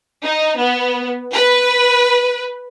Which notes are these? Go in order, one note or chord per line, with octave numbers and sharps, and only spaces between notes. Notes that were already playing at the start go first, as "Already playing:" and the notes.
D#4
B3
B4